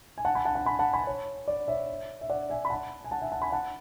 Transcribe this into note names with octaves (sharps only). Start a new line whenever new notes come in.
G#5
F#5 A5
G#5 B5
F#5 A5
F#5 A5
G#5 B5
F#5 A5
G#5 B5
C#5
D5
C#5 E5
E5
D5 F#5
E5 G#5
B5
F#5 A5
G#5
F#5 A5
E5 G#5
F#5 A5
G#5 B5
F#5 A5